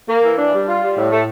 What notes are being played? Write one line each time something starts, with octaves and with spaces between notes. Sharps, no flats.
A#3
E3
D4
G3
F4
G3
A2
A3